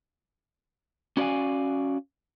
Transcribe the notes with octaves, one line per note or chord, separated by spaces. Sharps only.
C#4 F#4 D5 D#5 F5 G#5